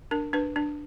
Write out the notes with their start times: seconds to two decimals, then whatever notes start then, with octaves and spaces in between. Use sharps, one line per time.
0.11 D4 A#4
0.33 D4 B4
0.56 D4